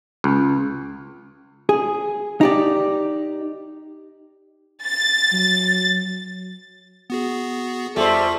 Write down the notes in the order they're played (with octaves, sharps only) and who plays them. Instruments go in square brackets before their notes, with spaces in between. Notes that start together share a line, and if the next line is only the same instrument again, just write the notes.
[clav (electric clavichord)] C#2
[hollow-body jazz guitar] G#4
D#4 G4 D5
[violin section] A6
[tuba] F#3
[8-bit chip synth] B3 F#4 G#4
[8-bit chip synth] E2 F4 C#6 [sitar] G3 C5 [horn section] A4 E5